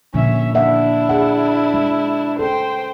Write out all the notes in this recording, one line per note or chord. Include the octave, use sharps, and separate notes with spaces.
A#2 D3 F3 C#4 E5
A#3 D4 E4 E5 F#5
G#4 F#5
G#3
C#4 A4 C5 G5